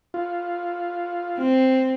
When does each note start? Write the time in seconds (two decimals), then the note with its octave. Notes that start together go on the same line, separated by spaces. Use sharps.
0.14 F4
1.38 C4